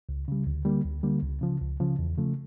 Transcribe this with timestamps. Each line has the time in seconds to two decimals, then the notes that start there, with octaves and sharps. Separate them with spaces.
0.09 C#2
0.28 C#3 G3
0.47 D2
0.65 D3 G3 A#3
0.85 D2
1.03 D3 G3 A#3
1.23 C#2
1.42 C#3 F3
1.61 C#2
1.80 C#3 F3
1.99 E2
2.17 C#3 F3 A3